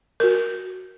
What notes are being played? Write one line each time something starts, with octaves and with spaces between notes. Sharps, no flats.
F#4 A#4